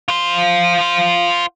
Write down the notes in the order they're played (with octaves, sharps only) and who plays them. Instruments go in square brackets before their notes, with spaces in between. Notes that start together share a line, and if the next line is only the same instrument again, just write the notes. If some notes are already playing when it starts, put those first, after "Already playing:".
[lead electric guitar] F4 C5